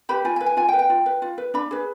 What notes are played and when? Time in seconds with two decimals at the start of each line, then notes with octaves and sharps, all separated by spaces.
0.09 G4 B4 B5
0.25 F4 G#5
0.36 G#5
0.41 B4
0.46 G#5
0.57 F4 G#5
0.68 G5
0.73 B4
0.79 G5
0.90 F4
1.06 B4
1.22 F4
1.38 B4
1.54 D4 B5
1.71 G#4 B4